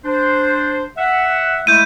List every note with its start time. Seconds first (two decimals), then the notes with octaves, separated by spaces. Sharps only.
0.05 D4 C5
0.98 E5 F#5
1.67 G#3 A3 E4 G6 D#7